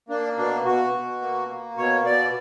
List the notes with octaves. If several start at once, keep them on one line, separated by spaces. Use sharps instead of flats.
A#3 D4
B2 D4
B2 F#4
B2
A#3
A#3
B2 C#5
B2 D5